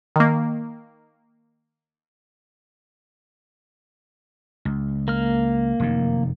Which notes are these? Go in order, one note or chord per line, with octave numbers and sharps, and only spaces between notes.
D#3 A#3
C#2
A#3 F6
F1 F#2 D#3